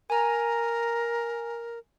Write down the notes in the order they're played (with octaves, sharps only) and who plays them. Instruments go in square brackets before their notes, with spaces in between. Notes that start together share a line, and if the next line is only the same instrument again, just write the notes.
[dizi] A#4 [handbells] G#5 A#5